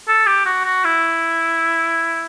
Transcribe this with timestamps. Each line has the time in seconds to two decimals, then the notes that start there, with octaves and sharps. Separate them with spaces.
0.08 A4
0.26 G4
0.46 F#4
0.65 F#4
0.84 E4